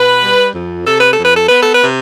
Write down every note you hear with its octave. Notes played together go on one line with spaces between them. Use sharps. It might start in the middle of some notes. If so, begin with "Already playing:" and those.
Already playing: B2 B4
G3
F2
C3 A4
B4
A4
F2
B4
A4
B3 B4
A4
B4
C3